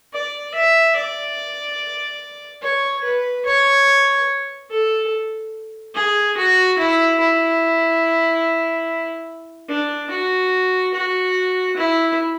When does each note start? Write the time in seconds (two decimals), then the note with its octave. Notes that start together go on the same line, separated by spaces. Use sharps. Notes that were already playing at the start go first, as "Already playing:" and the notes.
0.13 D5
0.55 E5
0.96 D5
2.62 C#5
3.04 B4
3.46 C#5
4.70 A4
5.95 G#4
6.37 F#4
6.78 E4
7.20 E4
9.69 D4
10.11 F#4
10.94 F#4
11.77 E4